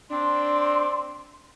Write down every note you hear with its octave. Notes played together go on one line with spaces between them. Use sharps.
C4 D4 C6